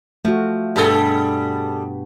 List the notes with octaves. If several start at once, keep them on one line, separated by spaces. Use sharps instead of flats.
F3 A3 F#4
G2 B2 G3 B3 G#4 A4